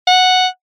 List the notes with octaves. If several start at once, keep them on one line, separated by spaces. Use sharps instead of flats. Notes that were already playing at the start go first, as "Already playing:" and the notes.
F#5